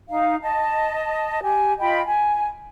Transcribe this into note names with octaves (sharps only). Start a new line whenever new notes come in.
D#4 F5
D#5 A5
G4 G#5
F4 D#5 G5 B5
G#5